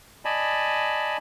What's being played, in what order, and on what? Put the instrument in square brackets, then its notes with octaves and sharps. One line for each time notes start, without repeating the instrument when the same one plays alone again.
[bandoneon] D5 D#5 G#5 A5 B5